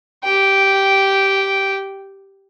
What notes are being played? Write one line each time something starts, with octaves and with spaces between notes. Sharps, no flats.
G4 G5